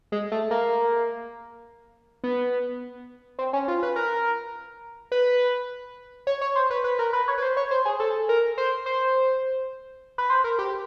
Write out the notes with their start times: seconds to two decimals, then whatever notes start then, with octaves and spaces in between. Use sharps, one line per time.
0.12 G#3
0.32 A3
0.51 A#3
2.24 B3
3.39 C4
3.53 C#4
3.68 F4
3.83 B4
3.96 A#4
5.12 B4
6.27 C#5
6.41 C#5
6.55 C5
6.70 B4
6.84 B4
6.99 A#4
7.13 B4
7.28 C#5
7.38 B4
7.42 C5
7.57 C#5
7.71 C5
7.85 G#4
8.00 A4
8.29 A#4
8.58 C5
8.86 C5
10.18 B4
10.30 C5
10.44 A#4
10.59 G4